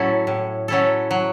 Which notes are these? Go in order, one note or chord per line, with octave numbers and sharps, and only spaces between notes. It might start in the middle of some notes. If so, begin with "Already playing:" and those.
Already playing: A2 F#3 C#4 E4 A4
A2
F#3 C#4 E4 A4
F#3